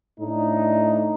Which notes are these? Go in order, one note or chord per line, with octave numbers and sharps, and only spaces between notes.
A2 D4 D#4